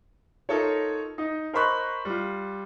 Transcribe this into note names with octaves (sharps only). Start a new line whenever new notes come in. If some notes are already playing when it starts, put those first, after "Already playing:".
D#4 F4 A4 A#4 C#5
D#4 D#5
A#4 C5 D#5 B5 C#6 F#6
G3 F4